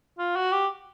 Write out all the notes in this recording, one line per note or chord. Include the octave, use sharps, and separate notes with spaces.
F4
F#4
G4